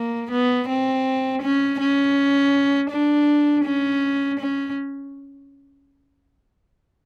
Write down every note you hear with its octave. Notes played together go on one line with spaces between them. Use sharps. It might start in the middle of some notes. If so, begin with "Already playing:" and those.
Already playing: A#3
B3
C4
C#4
C#4
D4
C#4
C#4